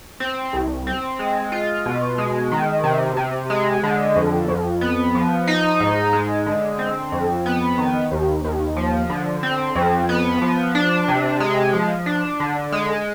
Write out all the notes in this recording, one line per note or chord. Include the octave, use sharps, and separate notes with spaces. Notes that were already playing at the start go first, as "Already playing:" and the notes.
C4
C2
C4
G#3
F4
B2
G#3
D#3
C3
C3
G#3
D3
F2
F2
B3
F3
D#4
G#2
G#3
D3
C4
F2
B3
D#3
D#2
D#2
F3
D3
C4
F2
B3
F3
D4
C3
G#3
F3
D4
D3
G#3